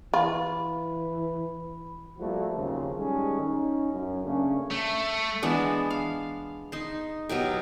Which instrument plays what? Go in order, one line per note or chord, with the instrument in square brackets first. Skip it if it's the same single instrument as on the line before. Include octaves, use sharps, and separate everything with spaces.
[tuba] E3 [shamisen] F4 [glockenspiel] B5
[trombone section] F3 G3 A3 A#3 E4 F#4
D#2 C#3 F3 F#3 A#3 C4
D#3 G3 G#3 C#4 G#4 A4
C#4 D#4
F#2
C#3 A3 A#3 C#4 D4
[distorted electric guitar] A3
[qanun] E3 G#3 B3 D4
F5
D#4 C6
B2 F#3 G4 A#4